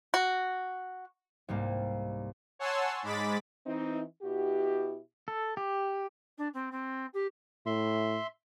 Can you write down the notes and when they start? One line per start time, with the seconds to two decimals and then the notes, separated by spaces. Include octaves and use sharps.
0.14 F#4
1.49 C2 G#2 G3 A#3
2.59 C#5 F#5 G#5 A5 C6 E6
3.03 G#2 G#3 B5 D6 A6 B6
3.66 E3 C4 D#4
4.23 B2 E4 F#4 G4
5.28 A4
5.57 G4
6.37 D4
6.53 C4
6.71 C4
7.13 G4
7.66 A2 E5 C6